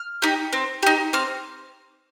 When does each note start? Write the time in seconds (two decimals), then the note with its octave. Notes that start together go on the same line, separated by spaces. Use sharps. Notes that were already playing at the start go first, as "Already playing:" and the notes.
Already playing: F6
0.22 D#4 G4
0.53 C4
0.83 D#4 G4
1.13 C4 F6